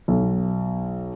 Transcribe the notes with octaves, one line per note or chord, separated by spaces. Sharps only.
B1